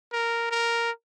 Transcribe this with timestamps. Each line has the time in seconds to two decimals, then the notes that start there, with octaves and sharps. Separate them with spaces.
0.13 A#4
0.51 A#4